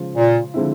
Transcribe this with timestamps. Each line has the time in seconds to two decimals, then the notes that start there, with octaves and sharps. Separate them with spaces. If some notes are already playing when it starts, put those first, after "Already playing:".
Already playing: C#3 F3 G#3
0.16 A#2
0.54 D3 F3 G#3 C4 E4